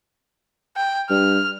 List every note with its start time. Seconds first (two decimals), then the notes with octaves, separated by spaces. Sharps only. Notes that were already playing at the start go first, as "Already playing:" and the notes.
0.76 G5
1.10 G2 F6